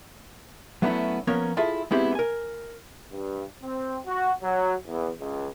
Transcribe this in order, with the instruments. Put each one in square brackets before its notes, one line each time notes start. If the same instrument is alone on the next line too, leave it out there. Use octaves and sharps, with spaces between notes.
[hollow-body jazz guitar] F#3 A3 B3 C#4 D4 E4
F3 A#3 B3 C#4 A#4 C#5
E4 F4 G#4 A4 E5
G#3 B3 C4 E4 G4 G#4
A#4 G#5
[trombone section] G2
C4
F#4
F#3
E2
C#2